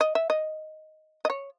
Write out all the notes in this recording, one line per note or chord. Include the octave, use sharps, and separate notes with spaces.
D#5
E5
D#5
D#5
C#5